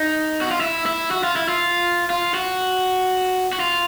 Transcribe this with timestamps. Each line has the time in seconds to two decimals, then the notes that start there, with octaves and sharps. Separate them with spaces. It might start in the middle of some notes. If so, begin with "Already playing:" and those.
Already playing: D#4
0.41 F#4
0.51 F4
0.61 E4
0.86 E4
1.11 F#4
1.24 F4
1.36 E4
1.48 F4
2.10 F4
2.34 F#4
3.53 F#4
3.60 F4